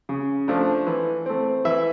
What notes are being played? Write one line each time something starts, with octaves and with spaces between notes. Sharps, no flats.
C#3
F3 A3 D4
E3
A3 C4
E3 E5